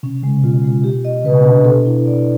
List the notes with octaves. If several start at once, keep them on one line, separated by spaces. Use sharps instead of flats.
C3 C#4
C#3 G#3
B2 F4
G#3
G4
D#5
C#3 B4
C3
B2
C3 D4
B2 A4
E4
D5